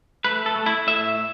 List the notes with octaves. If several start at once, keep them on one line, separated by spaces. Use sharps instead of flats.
A3 B4
A4
A3
E4
A2 E5